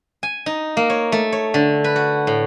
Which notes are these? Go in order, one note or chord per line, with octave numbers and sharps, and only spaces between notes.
G#5
D#4
A#3
C#5
A3
C#5
D3
B4
F#4
A2